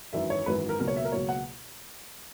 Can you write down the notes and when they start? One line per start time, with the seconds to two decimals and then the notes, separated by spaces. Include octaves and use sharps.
0.13 G#1 F#2 E3 E5
0.30 C#5
0.46 G#1 F#2 E3 B4
0.69 A#4
0.79 C#2 B2 F#3 A#3 A#4
0.88 C#5
0.97 E5
1.05 A#4
1.12 C#2 B2 F#3 A#3 C#5
1.29 F#5